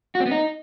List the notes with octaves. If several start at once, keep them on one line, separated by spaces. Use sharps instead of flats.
F#4
C4
B3
D#4